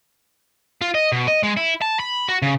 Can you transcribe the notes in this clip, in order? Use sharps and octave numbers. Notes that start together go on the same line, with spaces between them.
F4
D#5
B2
D#5
G#3
E4
A5
B5
F#4
C#3